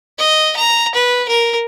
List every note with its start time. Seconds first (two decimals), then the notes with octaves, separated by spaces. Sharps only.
0.19 D#5
0.57 A#5
0.95 B4
1.28 A#4